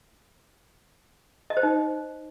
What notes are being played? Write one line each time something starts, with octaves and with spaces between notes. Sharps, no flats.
D#5
C5
D#4